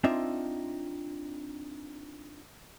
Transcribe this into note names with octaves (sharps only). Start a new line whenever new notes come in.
C4 D4 D#4 F4 E5